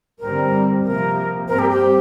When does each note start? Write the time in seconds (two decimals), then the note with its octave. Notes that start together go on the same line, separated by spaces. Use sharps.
0.19 G2 D3 G3 C4 A#4
0.83 C3 F3 A#3 A#4
1.48 G2 G3 C4 A#4
1.59 G4
1.70 G4